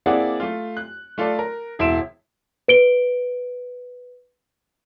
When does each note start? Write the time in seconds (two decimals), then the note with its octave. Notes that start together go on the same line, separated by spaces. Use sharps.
0.06 A#3 C4 E4 G#4 D5 F#5
0.40 A3 F4
0.77 F#6
1.18 A3 F4 A4 D5
1.39 A#4
1.79 E1 E4 E5 C6 D7 E7
2.68 B4 D7 G7